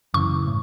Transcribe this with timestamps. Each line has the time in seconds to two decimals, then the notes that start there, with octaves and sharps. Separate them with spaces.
0.14 F#2 C#3 E3 C#6
0.47 A2